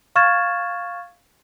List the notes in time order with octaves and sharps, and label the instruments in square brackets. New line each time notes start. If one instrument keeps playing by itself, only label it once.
[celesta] F5 C#6 F6 G#6 A6 E7